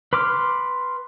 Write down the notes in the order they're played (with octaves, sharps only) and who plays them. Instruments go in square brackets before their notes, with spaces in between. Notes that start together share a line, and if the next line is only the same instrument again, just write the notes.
[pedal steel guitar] B4 C6 D6 F6